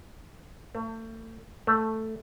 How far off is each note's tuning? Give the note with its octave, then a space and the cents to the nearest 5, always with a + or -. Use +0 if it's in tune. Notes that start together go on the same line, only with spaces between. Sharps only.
A3 +35
A3 +5